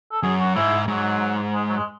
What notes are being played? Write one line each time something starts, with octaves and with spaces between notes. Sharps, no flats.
A4
F#2 G#4
F#4
G#2 E4
G#2 F#3
G#3
F#3
G#3